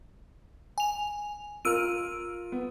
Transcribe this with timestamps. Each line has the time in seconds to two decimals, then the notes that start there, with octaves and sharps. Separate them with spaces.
0.78 G#5 F7
1.65 F4 A#4 E6 F6 D7 D#7
2.52 B3